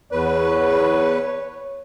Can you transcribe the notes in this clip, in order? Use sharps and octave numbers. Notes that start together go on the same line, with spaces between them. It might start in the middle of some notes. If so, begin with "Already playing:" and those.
E2 B4 C#5